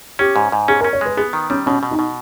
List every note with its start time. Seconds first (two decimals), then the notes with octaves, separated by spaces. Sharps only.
0.19 C#4 G4
0.36 G#2
0.52 G#2
0.68 C#4 G#4
0.81 A#4
0.84 C#4
0.93 C#5
1.01 G#3 B4
1.17 B3 G#4
1.33 D#3
1.50 G3 C#4
1.66 B2 C#4
1.83 B2
1.91 D#4
1.99 B2